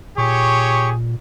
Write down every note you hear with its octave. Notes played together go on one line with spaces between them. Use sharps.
A#2 G4 G#4 C#5 C#6